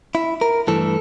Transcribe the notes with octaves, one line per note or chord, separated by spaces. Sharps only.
E4
A#4
G2 E3 A3 A4